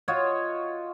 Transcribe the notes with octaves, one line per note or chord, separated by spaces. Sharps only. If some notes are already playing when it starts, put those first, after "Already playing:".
F4 F#4 C#5 D#5